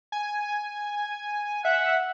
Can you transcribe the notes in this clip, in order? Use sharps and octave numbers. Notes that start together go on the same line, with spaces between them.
G#5
E5 F#5